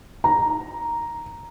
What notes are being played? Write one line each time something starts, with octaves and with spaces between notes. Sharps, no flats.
A#5